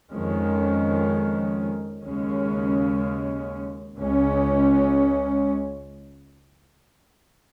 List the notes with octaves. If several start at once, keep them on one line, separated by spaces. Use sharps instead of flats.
F2 D#3 G#3 C#4
D#2 C#3 G#3 C#4
C#2 C#3 G#3 C#4